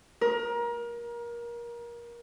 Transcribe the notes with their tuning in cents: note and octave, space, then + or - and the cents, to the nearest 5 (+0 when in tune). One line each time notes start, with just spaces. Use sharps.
A#4 +25